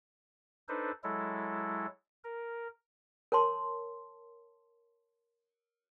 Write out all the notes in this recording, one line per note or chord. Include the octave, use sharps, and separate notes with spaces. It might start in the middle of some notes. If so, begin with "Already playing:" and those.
D4 D#4 A4 B4 C5
F#3 G#3 E4 A4
A#4
A#4 C#5 A5 C6